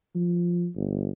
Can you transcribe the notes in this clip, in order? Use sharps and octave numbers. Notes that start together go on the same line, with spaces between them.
F3
G1